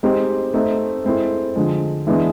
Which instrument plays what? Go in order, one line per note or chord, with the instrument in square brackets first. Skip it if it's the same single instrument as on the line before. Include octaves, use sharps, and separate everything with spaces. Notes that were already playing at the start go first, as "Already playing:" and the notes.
[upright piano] G#3 C4 D#4 G4
A3 C4 D#4
G#3 C4 E4 A4
D3 F3 G#3
E3 G#3 B3 D4